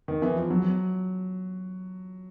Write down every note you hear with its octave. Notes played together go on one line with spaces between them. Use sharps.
D#3
E3
F3
F#3